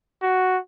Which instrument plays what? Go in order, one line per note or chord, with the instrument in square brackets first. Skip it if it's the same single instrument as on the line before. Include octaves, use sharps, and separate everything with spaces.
[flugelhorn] F#4